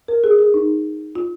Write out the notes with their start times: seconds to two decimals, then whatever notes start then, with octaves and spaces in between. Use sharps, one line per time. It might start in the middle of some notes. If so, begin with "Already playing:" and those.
0.08 A#4
0.24 G#4
0.39 G#4
0.54 D#4
1.15 F4